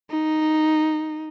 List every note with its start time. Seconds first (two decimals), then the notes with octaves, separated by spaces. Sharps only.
0.10 D#4